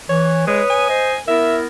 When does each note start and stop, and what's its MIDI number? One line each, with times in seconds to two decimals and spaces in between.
0.09 0.46 52
0.09 0.44 73
0.47 0.61 56
0.47 0.88 71
0.47 0.88 73
0.47 0.88 87
0.70 1.19 80
0.89 1.15 72
0.89 1.15 75
1.28 1.67 59
1.28 1.67 64
1.28 1.67 70
1.28 1.57 76